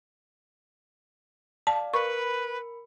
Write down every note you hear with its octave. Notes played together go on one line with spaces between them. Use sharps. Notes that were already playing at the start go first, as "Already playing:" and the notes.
D5 F5 A5
A#4 B4 B5 C#6 C#7